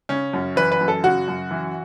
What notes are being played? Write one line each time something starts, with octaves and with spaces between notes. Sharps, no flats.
C#3 C#4
F#2
E3 B4
B4
F#2
A4
C#3 F#4
F#2
E3